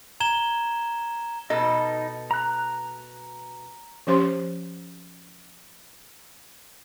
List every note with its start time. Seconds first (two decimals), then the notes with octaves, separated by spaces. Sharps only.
0.20 A#5 G#6 E7 G7
1.50 B2 D#4 A4 D#5
2.31 A#5 F#6
4.07 F3 C#4 G4 C5 C6